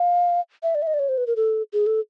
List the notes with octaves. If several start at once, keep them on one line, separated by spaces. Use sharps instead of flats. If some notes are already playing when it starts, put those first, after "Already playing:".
Already playing: F5
E5
D5
E5
D#5
D5
C#5
C5
B4
A#4
A4
G#4
A4